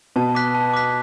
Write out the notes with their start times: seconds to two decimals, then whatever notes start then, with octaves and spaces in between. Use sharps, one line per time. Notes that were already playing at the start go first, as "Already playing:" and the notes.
0.16 B2 A5
0.35 D6 F#6 B6
0.55 A5
0.73 D6 F#6 B6